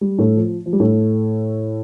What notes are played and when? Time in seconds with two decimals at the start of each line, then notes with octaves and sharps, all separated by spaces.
0.01 G3
0.19 A2 A3
0.37 F3
0.66 F3
0.73 G3
0.80 A2 A3